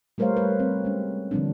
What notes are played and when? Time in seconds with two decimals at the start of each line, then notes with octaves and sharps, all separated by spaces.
0.18 G3 A3 A#4 C5 C#5 F5
0.37 B4
0.60 C4
0.85 G#3 C#4
1.31 D3 E3 F3 G3 C4 D4